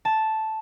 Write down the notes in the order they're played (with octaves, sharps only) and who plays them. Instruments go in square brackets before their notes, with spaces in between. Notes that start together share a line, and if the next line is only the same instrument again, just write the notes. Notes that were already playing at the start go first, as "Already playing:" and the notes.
[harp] A5